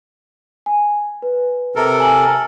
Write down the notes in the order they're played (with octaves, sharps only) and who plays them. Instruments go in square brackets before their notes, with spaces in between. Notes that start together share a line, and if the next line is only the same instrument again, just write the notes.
[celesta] G#5
B4
[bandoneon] C3 A4 A#4
[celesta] G#5 A#5 F#7